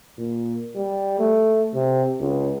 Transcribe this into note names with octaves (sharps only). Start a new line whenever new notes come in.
A#2
G3
A3
C3
C#2